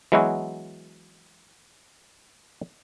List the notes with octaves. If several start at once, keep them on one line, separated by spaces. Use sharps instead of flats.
E3 F#3 G#3 B3 E4 F#4